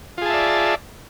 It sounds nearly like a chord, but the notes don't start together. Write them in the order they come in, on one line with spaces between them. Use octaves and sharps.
F4 G#4 A5 E5 D5